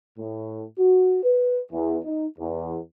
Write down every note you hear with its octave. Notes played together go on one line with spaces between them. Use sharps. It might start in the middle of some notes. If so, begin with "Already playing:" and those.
A2
F#4
B4
E2
D#4
E2